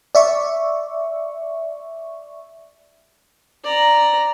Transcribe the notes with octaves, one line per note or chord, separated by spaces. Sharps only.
D5 E5 C#6
D5 A#5